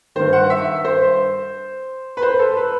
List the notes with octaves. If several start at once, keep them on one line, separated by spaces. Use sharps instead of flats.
G2 D#3 C5
F#5
E5
C5
B4
C5
A4
B4